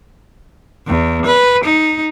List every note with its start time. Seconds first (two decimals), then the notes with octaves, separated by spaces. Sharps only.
0.87 E2
1.26 B4
1.64 D#4